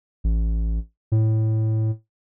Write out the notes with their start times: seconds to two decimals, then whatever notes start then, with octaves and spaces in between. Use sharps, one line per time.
0.24 A1
1.12 A2